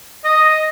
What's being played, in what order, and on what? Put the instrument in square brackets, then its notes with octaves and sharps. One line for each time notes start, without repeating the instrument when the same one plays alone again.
[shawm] D#5